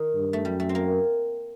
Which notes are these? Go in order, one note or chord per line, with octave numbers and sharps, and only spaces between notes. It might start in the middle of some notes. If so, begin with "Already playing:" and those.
Already playing: D#3
G2
A3
F#2 G3
A3
C4
A#3